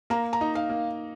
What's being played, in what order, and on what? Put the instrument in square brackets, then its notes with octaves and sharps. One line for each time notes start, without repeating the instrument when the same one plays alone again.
[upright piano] A#3 [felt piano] A#5
[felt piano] A#5
[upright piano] D#4
[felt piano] F5
[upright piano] A#3